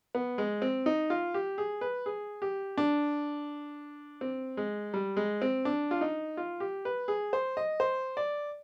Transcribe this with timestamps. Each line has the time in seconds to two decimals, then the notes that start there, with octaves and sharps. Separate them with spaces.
0.15 B3
0.38 G#3
0.62 C4
0.86 D#4
1.10 F4
1.34 G4
1.58 G#4
1.81 B4
2.06 G#4
2.42 G4
2.78 D4
4.21 C4
4.57 G#3
4.94 G3
5.17 G#3
5.42 C4
5.65 D4
5.91 F4
6.01 D#4
6.37 F4
6.60 G4
6.85 B4
7.08 G#4
7.33 C5
7.57 D#5
7.80 C5
8.17 D5